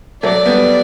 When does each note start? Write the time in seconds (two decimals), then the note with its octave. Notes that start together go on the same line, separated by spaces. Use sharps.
0.23 F#3 A3 D5
0.46 G3 B3